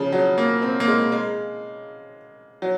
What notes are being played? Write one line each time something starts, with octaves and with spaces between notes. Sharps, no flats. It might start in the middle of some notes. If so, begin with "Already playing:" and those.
Already playing: C#3 F3
F#3
A#3
C4
A#3
G#3
G#3
F#3